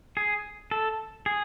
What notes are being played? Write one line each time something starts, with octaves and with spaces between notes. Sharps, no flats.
G#4
A4
G#4